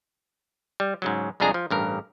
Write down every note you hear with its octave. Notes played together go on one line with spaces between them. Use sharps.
G3
G#2 C#3 F#3
C2 F2 G#3 D4 G#4 A#5
F3
A1 G2 A#4